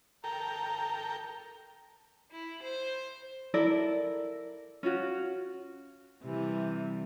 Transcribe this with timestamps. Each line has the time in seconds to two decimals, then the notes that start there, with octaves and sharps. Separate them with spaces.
0.24 A4 A#4 G5 A#5
2.32 E4
2.62 C5
3.54 E4 A4 A#4 D5
4.83 C#4 F4 F#4
6.24 C3 E3 G3